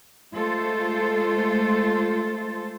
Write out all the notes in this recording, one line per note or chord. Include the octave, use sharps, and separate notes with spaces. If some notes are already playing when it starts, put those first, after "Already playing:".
G#3 A3 F4 A4 C5